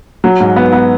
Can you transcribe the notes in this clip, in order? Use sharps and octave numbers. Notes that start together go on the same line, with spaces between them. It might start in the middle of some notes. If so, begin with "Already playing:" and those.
F#3
G#2
B3
B3